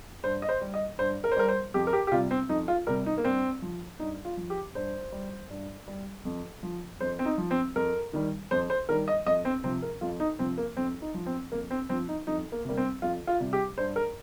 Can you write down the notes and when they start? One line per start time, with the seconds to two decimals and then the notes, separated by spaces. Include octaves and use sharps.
0.24 G2 C5
0.42 D#5
0.49 C5
0.61 G3
0.74 D#5
0.99 G2 C5
1.24 A#4
1.32 C5
1.36 G3 A#4
1.48 C5
1.74 F2 G4
1.87 A#4
1.93 G4
2.07 G4
2.12 C3 G3 F4
2.31 C4
2.49 F2 D#4
2.68 F4
2.87 C3 G3 A#4
3.06 D#4
3.18 A#3
3.24 G2 C4
3.62 F3
3.99 G2 D#4
4.25 F4
4.37 F3
4.50 G4
4.75 G2 C5
5.12 G3
5.50 G2
5.88 G3
6.25 F2
6.63 F3
7.00 F2 C5
7.19 C4
7.25 D#4
7.38 F3
7.51 C4
7.76 F2 A#4
8.13 D#3 G3
8.51 F2 C5
8.70 C5
8.89 D#3 G3 A#4
9.08 D#5
9.26 F2 D#5
9.45 C4
9.64 C3 F3 C4
9.82 A#4
10.01 F2 F4
10.20 D#4
10.39 C3 F3 C4
10.58 A#3
10.77 F2 C4
11.02 D#4
11.14 F3
11.26 C4
11.52 F2 A#3
11.70 C4
11.89 F3 C4
12.09 D#4
12.27 F2 D#4
12.52 A#3
12.65 C3 G3 A#3
12.77 C4
13.02 F2 F4
13.27 F4
13.40 C3 G3
13.53 G4
13.78 G2 C5
13.96 A#4